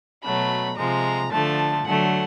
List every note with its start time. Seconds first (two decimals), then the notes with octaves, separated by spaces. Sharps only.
0.24 B2 F#3 A3 B5
0.78 C3 F3 G#3 A#5
1.32 D3 F3 A3 A5
1.85 D3 F#3 A3 F#5